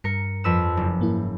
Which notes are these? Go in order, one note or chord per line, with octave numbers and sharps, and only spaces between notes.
G2 A#4 C#7
F2 B4 E6
F#1
G#2 A#3 E4